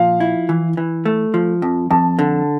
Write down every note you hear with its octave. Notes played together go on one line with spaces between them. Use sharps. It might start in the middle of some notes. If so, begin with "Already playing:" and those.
Already playing: A#2 F3 F5
E4
E3
E3
A3
F3
F2
F2 A5
D3